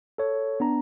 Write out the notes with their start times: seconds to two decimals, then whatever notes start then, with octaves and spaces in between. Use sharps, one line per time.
0.18 A4 C#5
0.60 B3 D4 A#5